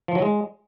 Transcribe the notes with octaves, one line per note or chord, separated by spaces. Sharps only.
F3
F#3
G#3